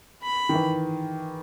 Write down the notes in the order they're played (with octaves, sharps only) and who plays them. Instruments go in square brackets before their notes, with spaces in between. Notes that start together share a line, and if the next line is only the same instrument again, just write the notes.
[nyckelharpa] B5
[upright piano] D#3
E3